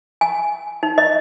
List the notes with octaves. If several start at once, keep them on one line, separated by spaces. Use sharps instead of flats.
G#5
D#4
D#5